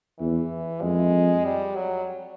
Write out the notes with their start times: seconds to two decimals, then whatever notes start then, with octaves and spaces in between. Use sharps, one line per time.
0.19 E2 E3
0.82 F2 G#3
1.45 G3
1.76 F#3